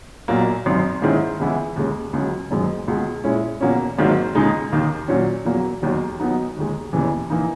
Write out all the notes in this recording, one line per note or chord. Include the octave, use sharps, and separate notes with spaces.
B1 A#2 F#3 A#3
G#1 F#2 D#3
G#2 D#3 G#3 C#4 E4
C#2 C#3 E3 B3 E4
D#2 C#3 G#3
C#2 C#3 F#3
F#1 F#2 D#3 G#3
C#2 B2 G#3
A#2 G#3 C#4 E4
E2 B2 A#3 C#4
G#1 G#2 D#3 F#3 A#3
C#2 C#3 G#3 D#4
D#2 D#3 A#3 D#4
A#2 F#3 C#4
E2 B2 F#3 A#3
E1 D#2 D#3 F#3
B1 B2 F#3 B3 D#4
D#2 D#3 G#3
E1 D#2 C#3 E3
E3 A#3 D#4